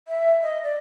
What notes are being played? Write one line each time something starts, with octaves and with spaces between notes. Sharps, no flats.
E5
D#5
D5